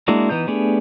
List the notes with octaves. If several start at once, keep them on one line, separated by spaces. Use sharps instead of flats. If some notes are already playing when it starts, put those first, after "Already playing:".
G#3 A#3 D4 E4 F#4
E3 B3 D#4 G6
A3 B3 D4 G4 G#4